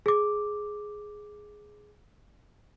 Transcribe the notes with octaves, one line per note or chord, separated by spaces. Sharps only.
G#4 D6